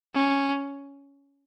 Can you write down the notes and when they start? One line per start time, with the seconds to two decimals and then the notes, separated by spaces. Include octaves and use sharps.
0.14 C#4